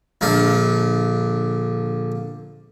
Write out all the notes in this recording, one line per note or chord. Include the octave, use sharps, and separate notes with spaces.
A#1 D3 F5